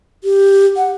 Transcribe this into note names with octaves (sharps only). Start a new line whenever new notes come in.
G4
F#5